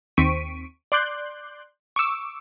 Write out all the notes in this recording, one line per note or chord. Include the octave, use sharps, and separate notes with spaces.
D#2 C4 C#6 B6 D7 D#7
D5 C6 D6 F#6 G6
C#6 D6 E6